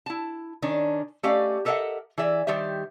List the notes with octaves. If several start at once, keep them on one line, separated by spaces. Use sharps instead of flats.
E4 A5
D#3 C#4 D4
A3 C#4 G4 D5 D#5 F5
G4 A4 A#4 D#5 E5 F#5
E3 G#4 D5 E5
D#3 G3 G4 C5 E5